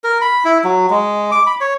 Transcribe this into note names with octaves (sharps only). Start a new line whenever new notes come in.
A#4
B5
E4
F#3
G#3
D6
B5
C#5